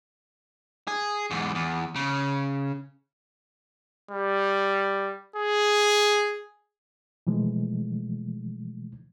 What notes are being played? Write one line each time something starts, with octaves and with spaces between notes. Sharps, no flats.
G#4
E2 G#2
E2
C#3
G3
G#4
B2 E3 F3 G#3 A3